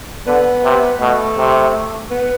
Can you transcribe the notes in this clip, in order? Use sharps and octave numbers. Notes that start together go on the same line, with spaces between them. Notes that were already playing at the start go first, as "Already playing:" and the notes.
D3 B3
C3
B2 A3
C3
B3